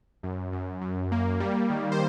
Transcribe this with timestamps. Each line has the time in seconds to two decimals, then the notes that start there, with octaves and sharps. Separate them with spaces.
0.23 F#2
0.52 F#2
0.81 F#2
1.12 A#3
1.40 G3
1.70 D#3
1.92 C5